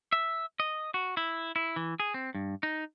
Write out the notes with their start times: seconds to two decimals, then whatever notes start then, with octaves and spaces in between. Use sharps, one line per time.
0.12 E5
0.60 D#5
0.94 F#4
1.17 E4
1.56 E4
1.76 E3
2.00 G#4
2.14 C4
2.35 G2
2.63 D#4